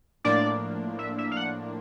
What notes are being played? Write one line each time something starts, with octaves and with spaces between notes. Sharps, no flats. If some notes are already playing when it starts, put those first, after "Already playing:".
A2 F3 A#3 D4 D5
E5
E5
F5
F#5